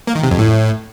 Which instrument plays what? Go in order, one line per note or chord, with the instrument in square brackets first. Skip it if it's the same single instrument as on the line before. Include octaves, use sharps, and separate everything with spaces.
[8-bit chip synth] A#3
D#3
C3
F2
A2